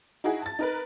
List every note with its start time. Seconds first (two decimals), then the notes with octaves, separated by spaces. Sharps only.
0.24 D#4 E4 F#4 G#4
0.42 A5 A6
0.59 D#4 A#4 B4